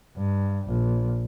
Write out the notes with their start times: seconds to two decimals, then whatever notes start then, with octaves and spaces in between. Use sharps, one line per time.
0.17 G2
0.67 A#1